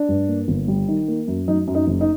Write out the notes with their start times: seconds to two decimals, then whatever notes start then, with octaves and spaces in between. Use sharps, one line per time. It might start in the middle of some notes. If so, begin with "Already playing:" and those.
Already playing: D4
0.09 G2
0.28 A#3
0.48 G1
0.68 G3
0.88 D#3
1.08 A#3
1.27 F#2
1.48 F#3 D#4
1.67 F#2
1.75 D#4
1.87 F#1
2.01 D#4